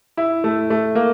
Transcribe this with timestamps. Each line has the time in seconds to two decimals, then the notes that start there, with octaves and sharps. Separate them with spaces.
0.17 E4
0.44 A3
0.70 A3
0.95 A#3